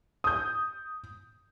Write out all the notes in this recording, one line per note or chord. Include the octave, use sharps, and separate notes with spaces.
D#6 G6